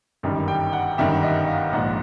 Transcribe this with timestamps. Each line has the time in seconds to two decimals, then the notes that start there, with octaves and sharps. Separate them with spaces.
0.23 G1 F#2 D#3 G3
0.48 G5
0.73 F#5
0.98 G1 F#2 D#3 G3 E5
1.23 D#5
1.48 F5
1.73 A#1 G#2 F3 F#5